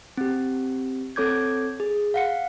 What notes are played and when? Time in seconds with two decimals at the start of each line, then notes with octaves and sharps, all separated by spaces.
0.17 C4 G4
1.16 C4 A4 C#5 D6 G6 G#6
1.80 G#4
2.14 F5 F#5 C#7